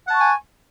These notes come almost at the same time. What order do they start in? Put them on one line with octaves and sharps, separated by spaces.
F#5 A5 C#6 G#5